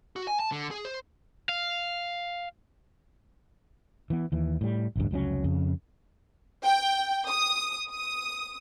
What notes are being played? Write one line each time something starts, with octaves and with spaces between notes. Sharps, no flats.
F#4
G#5
A5
D3
G#4
C5
F5
E3 B3
D#2 E3
A2 G3
A1 D2 G2
F1 C#2 F#3 C#4
F2 C#3
G5
D#6
D#6